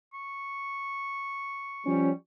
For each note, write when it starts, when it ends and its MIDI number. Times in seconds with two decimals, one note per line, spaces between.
0.14 2.16 85
1.86 2.10 53
1.86 2.10 55
1.86 2.10 61